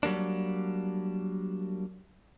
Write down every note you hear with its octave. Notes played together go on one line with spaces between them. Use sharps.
F#3 G3 A#3 D4